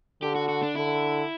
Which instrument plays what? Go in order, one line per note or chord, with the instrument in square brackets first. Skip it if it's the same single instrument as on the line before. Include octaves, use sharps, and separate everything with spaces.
[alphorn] D3 [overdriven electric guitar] G4
[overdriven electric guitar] F#4
F#4
D4
[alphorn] D3 [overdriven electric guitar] E4